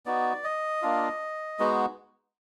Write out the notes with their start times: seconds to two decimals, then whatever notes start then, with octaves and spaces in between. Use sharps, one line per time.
0.06 B3 D#4 F#4 D5
0.44 D#5
0.82 A#3 D4 F4
1.59 G#3 B3 D#4 F#4